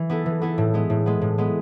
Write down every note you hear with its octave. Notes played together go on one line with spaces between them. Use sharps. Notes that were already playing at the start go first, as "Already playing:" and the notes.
Already playing: E3
B3 E4 A4
E3
B3 E4 A4
A2
G#3 B3
A2
G#3 B3
A2
G#3 B3